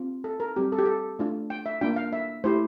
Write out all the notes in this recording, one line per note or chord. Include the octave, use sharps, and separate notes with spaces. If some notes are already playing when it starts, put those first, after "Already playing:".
Already playing: C4 F4
A4
A#4
G3 C4 G4
A4
G4
A4
A3 D4 F4
G5
E5
A#3 D4 F4 G5
F5
E5
A3 E4 G4 C5